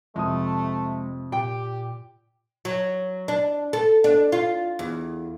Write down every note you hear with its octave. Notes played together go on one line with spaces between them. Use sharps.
F2 C3 G#3 A3 D#6
A#2 G4 G5
F#3
D4
A4
D4
F4
E2